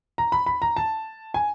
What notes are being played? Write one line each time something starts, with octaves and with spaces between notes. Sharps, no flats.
A#5
B5
B5
A#5
A5
G#5